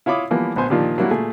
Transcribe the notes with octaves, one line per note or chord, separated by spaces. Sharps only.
E4 F4 C#5 B5 D6 D#6
E3 F3 G3 A#3 B3
A#1 B3 C5 G#5
A#2 D#3 F3 D4 G4
F#3 G3 A#3 D4 E4 F#4
A#2 A3 G#4